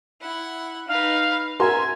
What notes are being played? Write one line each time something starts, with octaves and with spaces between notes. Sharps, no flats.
E4 F#5
D#4 B4 F5
F#4 A#4 E5 G#5 C6